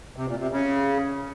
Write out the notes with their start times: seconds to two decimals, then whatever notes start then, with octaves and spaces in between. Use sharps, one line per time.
0.16 C3
0.28 A#2
0.40 C3
0.52 C#3